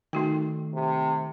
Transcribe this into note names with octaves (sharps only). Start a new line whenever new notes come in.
D#3 A3 D#4 F#4 G5
C3